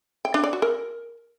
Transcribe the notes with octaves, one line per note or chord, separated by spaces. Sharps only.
G5
D4
D5
F#4
A#4